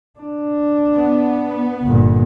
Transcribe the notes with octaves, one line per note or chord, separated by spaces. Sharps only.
D4
B3
G1 A#2